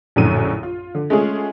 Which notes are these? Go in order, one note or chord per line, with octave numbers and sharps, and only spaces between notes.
A#1 F#2 A2 D3 D#7
F4
D3
G#3 A3 C#4 F4 G#4